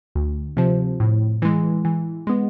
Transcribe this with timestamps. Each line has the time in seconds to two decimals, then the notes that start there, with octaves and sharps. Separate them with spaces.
0.15 D2
0.57 C3 F3
1.00 A2
1.42 E3 G#3
1.85 E3
2.27 G#3 B3